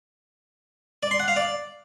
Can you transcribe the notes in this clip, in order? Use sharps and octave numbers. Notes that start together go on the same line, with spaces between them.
D5
C6
F#5
F5
D5